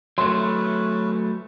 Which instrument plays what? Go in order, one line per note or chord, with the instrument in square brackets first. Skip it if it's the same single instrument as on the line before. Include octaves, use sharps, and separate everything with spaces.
[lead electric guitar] F#3 A3 [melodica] C#4 E4 B4 [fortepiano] C6